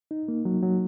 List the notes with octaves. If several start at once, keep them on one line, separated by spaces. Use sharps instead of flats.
D#4
A#3
F#3
F#3